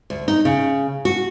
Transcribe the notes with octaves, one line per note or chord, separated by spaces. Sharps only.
D2
D#4
C#3
F#4